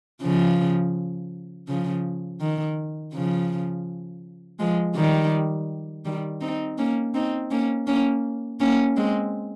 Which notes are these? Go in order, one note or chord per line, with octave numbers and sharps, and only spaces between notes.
C#3 F3
C#3 F3
D#3
C#3 F3
F3 G#3
D#3 G3
D#3 G3
C4 D#4
A#3 C#4
C4 D#4
A#3 C#4
A#3 C#4
A#3 C#4
G#3 C4